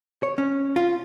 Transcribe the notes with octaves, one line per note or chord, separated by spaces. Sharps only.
C#5
C#4
F4